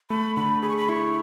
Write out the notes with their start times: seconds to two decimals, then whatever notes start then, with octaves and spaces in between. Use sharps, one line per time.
0.10 A3 B5
0.36 D3 B5
0.62 G#4 B5
0.69 C#6
0.77 B5
0.89 E4 C#6